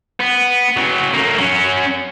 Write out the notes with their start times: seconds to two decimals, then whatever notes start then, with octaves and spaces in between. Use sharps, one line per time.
0.20 B3
0.77 C#3 F#3
1.14 A3 A#3
1.39 F#3 C#4